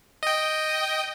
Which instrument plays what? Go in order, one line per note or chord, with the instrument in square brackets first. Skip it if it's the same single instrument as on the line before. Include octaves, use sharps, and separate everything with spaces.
[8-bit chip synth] D#5 G5